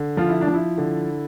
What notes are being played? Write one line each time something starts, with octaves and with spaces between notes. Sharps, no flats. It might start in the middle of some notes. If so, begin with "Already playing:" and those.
Already playing: D3
F3 F4
E4
D4
F3
E4
D3